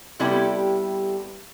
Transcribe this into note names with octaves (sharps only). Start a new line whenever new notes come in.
C3 G3 B3 E4 G4 A4